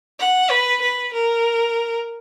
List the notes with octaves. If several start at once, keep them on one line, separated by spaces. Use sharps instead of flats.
F#5
B4
B4
A#4